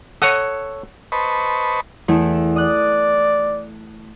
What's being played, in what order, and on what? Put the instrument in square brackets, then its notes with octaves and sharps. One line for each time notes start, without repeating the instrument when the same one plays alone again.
[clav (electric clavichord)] A4 C#5 [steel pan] F#5 D#6
[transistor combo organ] B4 C5 D#5 A5 B5 C#6
[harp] E2 A3 E4
[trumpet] D5 [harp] D#6 F#6